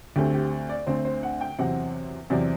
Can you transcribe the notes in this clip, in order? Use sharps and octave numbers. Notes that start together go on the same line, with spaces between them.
D2 D3 A3 C4 G4
G4
D5
D2 D3 A3 C4 C5
C5
F#5
G5
E2 C3 F#3 C4 F#5
E2 C3 F#3 C4 D5